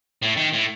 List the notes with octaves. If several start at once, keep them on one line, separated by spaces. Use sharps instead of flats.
A2
D#3
A2